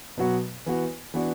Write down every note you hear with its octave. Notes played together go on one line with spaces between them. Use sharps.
B2 F#3 B3 F#4
E3 B3 F#4
E3 B3 D4 F#4